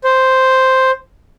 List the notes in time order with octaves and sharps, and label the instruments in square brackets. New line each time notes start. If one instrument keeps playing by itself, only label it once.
[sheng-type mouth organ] C5